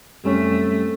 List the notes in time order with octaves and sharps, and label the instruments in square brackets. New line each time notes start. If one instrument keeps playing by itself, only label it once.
[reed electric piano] F#2 G3 C#4 [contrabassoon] C3 [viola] A3